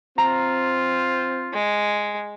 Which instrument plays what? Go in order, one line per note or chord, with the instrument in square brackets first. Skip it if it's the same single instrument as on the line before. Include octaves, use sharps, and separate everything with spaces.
[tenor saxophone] C4 [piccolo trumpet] F4 [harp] A#5
[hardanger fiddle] G#3